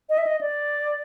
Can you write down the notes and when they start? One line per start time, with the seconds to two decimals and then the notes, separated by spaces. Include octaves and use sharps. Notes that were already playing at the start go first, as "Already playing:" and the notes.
0.09 D#5
0.18 E5
0.27 D#5
0.41 D5